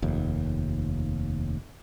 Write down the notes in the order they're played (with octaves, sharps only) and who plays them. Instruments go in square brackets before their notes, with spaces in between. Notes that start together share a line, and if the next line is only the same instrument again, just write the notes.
[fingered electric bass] F1 D#2